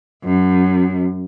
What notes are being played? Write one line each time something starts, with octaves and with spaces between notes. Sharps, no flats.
F#2